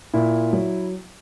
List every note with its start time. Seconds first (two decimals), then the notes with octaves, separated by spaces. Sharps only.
0.14 A#2 E4
0.53 F#3